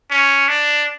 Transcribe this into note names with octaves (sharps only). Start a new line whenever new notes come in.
C#4
D4